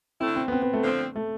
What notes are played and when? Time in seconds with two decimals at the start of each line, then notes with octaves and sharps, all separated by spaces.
0.20 D3 A3 C4 E4
0.36 C4
0.48 B3
0.52 C4
0.62 B3
0.73 A3
0.83 D3 F3 C4
1.16 A3